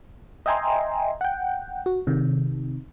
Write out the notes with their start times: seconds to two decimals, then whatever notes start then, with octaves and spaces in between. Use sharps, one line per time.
0.46 D#5 E5 G5 G#5 A#5 C6
1.21 F#5 G5
1.86 F#4
2.07 C3 D#3